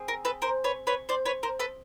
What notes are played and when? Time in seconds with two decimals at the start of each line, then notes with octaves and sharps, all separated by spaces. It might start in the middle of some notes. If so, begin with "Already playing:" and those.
Already playing: C4 G#4
0.08 A#4
0.25 A4 B4
0.42 A#4 C5
0.64 B4 C#5
0.87 B4 C#5
1.09 C5 D5
1.25 B4 C#5
1.43 A#4 C5
1.59 A4 B4